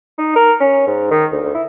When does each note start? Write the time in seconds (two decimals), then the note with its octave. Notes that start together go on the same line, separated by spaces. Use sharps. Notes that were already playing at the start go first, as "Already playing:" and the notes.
0.18 D#4
0.36 A#4
0.60 C#4
0.87 G#2
1.11 D#3
1.32 D2
1.43 D2
1.55 E4